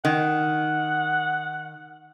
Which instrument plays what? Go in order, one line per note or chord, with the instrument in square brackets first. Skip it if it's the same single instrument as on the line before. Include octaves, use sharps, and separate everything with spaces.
[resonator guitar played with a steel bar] D#3 [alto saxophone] F#5